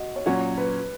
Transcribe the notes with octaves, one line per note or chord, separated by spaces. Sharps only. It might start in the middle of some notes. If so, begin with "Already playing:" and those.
Already playing: F#4 D#5
C#5
A#2 F#3 C#4 F#4
B4